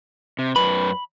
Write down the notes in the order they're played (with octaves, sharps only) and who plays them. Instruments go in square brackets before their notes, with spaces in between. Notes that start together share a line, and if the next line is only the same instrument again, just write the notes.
[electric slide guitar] C3
[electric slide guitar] F#2 B4 [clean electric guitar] B5